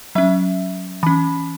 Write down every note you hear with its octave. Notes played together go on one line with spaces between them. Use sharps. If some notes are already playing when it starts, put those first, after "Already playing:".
F#3 C#4 E5
E3 C#4 B5